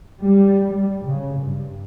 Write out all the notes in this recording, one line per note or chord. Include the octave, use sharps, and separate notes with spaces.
G3
G3
C#3
G2